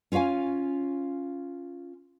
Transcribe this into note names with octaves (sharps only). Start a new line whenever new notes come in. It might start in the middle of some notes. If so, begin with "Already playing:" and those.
C#4 F4 C#5 F5 G#5